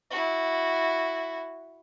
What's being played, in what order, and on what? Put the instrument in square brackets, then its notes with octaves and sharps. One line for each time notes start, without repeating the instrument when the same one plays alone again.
[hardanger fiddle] E4 F#4